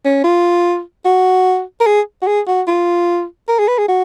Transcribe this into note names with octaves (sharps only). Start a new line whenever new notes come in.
C#4
F4
F#4
A#4
G#4
F#4
G#4
F#4
F4
A#4
G#4
B4
G#4
F#4